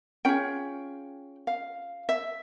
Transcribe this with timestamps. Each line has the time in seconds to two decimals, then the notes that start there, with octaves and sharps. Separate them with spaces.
0.25 C#4 F4 G#4 G5
1.47 F5
2.09 E5